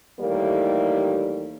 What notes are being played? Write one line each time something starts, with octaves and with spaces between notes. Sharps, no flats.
D#2 D#3 E3 G3 A3 A#3